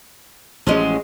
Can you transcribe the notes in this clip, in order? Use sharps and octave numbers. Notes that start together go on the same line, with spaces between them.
A1 F3 F#3 G#3 C#4